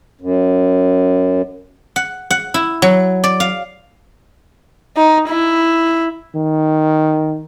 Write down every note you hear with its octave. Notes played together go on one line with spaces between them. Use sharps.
F#2
F#5
F#5
E4
F#3
D5
F5
D#4
E4
D#3